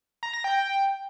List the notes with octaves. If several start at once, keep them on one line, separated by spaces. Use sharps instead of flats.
A#5
A#6
G5